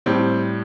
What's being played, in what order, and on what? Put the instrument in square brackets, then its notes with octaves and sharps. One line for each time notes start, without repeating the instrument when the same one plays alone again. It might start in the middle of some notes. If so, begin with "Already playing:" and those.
[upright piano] A2 G3 C4